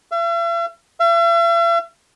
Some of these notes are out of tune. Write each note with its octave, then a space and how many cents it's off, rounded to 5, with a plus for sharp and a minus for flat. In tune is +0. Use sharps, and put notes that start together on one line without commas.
E5 +45
E5 +45